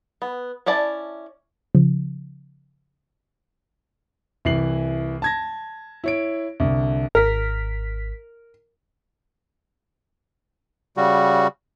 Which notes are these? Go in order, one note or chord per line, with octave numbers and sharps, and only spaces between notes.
B3
C#4 E4 D5 A5
C#3 F3
C2 E3 C7 F#7
A5 G#6 A#6
E4 C#5 D7
C2 D3
G#1 A#4 B6
C#3 G3 F#4